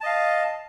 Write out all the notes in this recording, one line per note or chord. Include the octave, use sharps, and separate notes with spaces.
D#5 F5 A5